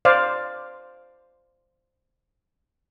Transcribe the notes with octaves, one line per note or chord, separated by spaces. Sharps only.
C5 D5 F5